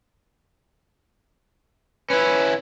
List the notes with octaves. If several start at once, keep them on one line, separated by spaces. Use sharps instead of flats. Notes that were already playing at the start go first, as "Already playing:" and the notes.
C#4 E4 B4